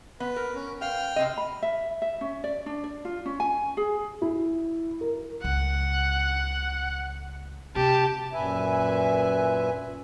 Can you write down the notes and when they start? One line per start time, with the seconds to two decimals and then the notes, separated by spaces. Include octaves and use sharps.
0.20 B3 B4
0.36 A#4
0.55 C#4
0.81 B3 F5 G5 F6
1.16 C3 C4 D#5
1.38 B5
1.63 E5
2.02 E5
2.21 C#4
2.44 D5
2.66 D4
2.84 D5
3.05 F4
3.26 C#4
3.40 G#5
3.77 G#4
4.22 E4
5.01 A#4
5.44 C#2 C#3 F#5
7.76 C3 G4 A5
8.33 F#2 A#2 B4 E5 G#5